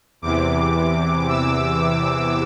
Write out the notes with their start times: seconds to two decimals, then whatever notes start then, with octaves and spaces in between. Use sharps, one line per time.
0.22 E2 C3 E3 D6
1.29 E6